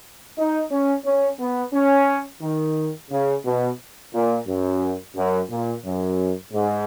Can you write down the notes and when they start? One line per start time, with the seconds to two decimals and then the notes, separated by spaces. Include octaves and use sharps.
0.37 D#4
0.71 C#4
1.05 C#4
1.39 B3
1.73 C#4
2.42 D#3
3.11 C#3
3.45 B2
4.13 A#2
4.48 F#2
5.16 F#2
5.50 A#2
5.85 F#2
6.53 G#2